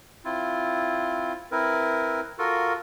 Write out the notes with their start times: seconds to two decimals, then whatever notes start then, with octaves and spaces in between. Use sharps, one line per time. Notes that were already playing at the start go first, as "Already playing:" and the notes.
0.25 C4 E4 F4
1.51 C4 E4 A#4 B4
2.38 F4 F#4 A4 A#4